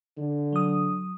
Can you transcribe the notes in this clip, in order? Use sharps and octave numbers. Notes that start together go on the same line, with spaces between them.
D3
F#3 D#6